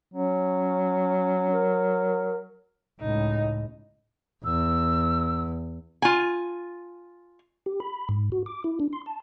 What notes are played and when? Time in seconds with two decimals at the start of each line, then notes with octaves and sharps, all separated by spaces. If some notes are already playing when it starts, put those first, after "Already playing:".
0.14 F#3 C#4
1.52 A#4
3.00 C#2 A2 D#4
4.45 E2 E6
6.02 F4 G#5
7.66 G4
7.80 B5
8.09 G#2
8.32 F#4
8.46 D6
8.64 E4
8.80 D4
8.93 C6
9.06 A5